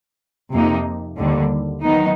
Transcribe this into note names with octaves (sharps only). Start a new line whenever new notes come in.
F2 C3 F3 A#3 D#4
D#2 D3 G3
D#3 F#3 B3 D#4